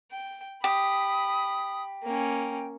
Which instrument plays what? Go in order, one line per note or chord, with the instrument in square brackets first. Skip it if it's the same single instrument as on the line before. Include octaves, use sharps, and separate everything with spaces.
[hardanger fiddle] G5
[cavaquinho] G4 [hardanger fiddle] B5 [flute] D#6
[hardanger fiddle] A#3 C#4 [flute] G5